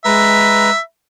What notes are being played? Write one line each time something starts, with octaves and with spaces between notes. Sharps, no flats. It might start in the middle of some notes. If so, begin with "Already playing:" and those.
G#3 B4 E5 A#5